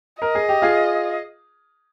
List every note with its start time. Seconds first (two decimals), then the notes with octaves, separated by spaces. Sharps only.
0.22 A#4 D#5
0.35 G#4
0.49 G4
0.62 F4 G#4